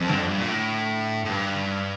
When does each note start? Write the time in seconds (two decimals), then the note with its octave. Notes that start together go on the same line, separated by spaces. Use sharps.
0.01 F2
0.09 G2 D3
0.19 F2
0.29 G2
0.39 A#2
0.49 A2
1.25 A2
1.29 G2